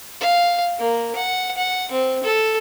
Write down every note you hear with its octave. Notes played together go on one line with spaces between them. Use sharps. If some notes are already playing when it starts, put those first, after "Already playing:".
F5
A#3
F#5
F#5
C4
A4